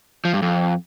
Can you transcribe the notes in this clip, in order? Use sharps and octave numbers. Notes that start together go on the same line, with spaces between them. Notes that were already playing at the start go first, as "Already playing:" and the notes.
F3
G2
F2